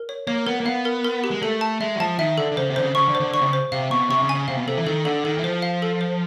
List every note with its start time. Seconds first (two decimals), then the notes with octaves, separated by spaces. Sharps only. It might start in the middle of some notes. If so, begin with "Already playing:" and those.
Already playing: A#4
0.09 C#5
0.27 A#3 C#5
0.47 B3 A#4
0.60 A#3
0.66 B3 F5
0.85 A#4
1.05 A#4
1.24 G4
1.31 G#3
1.42 A3 A4
1.61 A5
1.81 G#3 E5
1.95 F#3
2.00 F3 A5
2.19 D#3 E5
2.38 D3 A4
2.52 D3
2.57 C#3 C5
2.70 C3
2.76 D3 C5
2.82 C#3
2.95 C#3 C#6
3.08 D3
3.15 C5
3.20 D3
3.34 D3 C#6
3.41 C3
3.46 C#3
3.53 C5
3.72 C3 F5
3.91 B2 C#6
4.10 C3 C#6
4.22 C#3
4.29 G#5
4.35 C#3
4.48 C3 F5
4.57 B2
4.68 C3 A4
4.77 E3
4.87 D#3 A4
5.05 D3 A4
5.25 D#3 A4
5.38 E3
5.44 F3 C5
5.62 F5
5.82 A4
6.01 C5